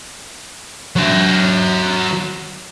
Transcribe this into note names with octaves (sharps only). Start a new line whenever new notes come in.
F#3 E5